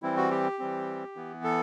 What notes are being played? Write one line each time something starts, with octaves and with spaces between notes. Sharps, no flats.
E3 G3 C4 E4
F#4
G4
E3 G3 C4
E3 B3
A4